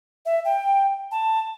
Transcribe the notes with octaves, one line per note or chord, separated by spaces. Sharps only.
E5
G5
A5